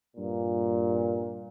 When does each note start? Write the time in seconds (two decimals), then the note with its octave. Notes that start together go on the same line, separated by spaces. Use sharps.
0.17 G2 A#2